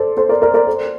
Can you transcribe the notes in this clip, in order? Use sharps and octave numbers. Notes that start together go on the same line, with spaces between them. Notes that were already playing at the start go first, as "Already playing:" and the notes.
Already playing: A4 C5 D5
A4 C5
A#4 D5
A#4 D5
A#4 D5
A4 C5